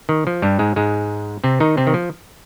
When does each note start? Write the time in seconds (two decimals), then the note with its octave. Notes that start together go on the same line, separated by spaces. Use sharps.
0.09 D#3
0.27 F3
0.42 G2 G3
0.59 G#2 G#3
0.76 G#2 G#3
1.44 C3 C4
1.60 D#3 D#4
1.77 C3 C4
1.87 D#3
1.94 F3